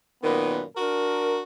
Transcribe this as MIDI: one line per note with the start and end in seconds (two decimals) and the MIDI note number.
0.23 0.62 42
0.23 0.62 46
0.23 0.62 51
0.23 0.62 59
0.23 0.62 71
0.76 1.41 62
0.76 1.41 66
0.76 1.41 70